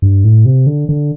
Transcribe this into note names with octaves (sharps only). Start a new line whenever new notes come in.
G2
A2
C3
D3
D3